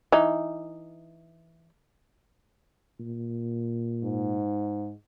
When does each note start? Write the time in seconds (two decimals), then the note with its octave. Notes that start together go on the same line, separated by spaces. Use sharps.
0.12 E3 D#4
3.00 A#2
4.04 G#2